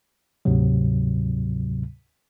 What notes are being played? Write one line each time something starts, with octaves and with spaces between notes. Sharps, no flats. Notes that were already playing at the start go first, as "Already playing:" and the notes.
D2 G#2 C3 F#3